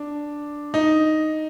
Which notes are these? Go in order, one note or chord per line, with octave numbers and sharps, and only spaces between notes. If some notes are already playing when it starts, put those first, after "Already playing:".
Already playing: D4
D#4